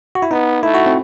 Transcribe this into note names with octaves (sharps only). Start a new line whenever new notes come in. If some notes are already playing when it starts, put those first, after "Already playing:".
F#4
E4
B3 D#4
A3 E4
F#4
C4